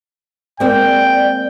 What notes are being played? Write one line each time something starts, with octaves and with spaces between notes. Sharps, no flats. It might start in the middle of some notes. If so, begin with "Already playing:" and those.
G#3 A#3 C4 D5 G5